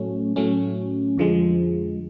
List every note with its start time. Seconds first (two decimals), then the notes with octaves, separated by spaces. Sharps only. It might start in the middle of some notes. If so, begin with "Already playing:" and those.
Already playing: A2 F#3 A3 C#4
0.36 A2 F#3 A3 C#4
1.18 F2 D3 F3 G#3